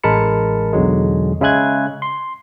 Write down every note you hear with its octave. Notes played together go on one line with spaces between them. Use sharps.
A1 G#3 A#4 A5 B5 C#7
B1 E2 D3 F#3 G#3
C#3 G#3 E5 G#5 F#6 G#6
C6